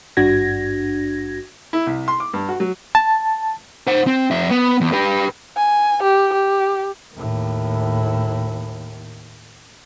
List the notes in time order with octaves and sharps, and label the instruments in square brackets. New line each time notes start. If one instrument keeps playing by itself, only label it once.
[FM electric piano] G#1 G2 D4 F#4 G#6 A#6
[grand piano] E4
C2
C6
D6
G2
F#4
F#3
[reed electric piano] A5
[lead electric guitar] C5 F#5
C4
F2 E5
B3
E2
G4 B4
[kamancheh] G#5
G4
G4
[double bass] D#2 A2